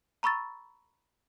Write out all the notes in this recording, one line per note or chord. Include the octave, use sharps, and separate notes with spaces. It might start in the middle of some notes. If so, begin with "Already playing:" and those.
A#5 B5 C#6 E6 A6